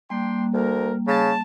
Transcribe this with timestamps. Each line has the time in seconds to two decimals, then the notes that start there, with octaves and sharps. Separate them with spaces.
0.10 G3 A#3 D4 G5 C6
0.54 D2 A#4
1.07 C#3 A5